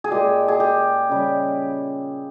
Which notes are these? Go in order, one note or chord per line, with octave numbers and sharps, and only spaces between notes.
G#4
A#2 G#3 G4
G#4
G4
C#3 G3